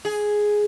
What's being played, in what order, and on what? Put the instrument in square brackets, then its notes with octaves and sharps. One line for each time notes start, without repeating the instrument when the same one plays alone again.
[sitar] G#4